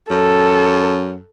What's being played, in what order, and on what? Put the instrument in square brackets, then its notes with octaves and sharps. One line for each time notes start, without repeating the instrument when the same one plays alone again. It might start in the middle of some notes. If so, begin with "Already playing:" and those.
[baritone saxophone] F#2 [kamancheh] A4